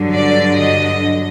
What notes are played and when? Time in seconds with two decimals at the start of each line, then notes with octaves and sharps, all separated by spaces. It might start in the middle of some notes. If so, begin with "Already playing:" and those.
Already playing: G2 D3 F#3
0.13 D5
0.58 D#5